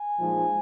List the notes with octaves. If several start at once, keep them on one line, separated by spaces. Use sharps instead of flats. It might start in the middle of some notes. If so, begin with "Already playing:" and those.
Already playing: G#5
A#2 F3 G#3 D#4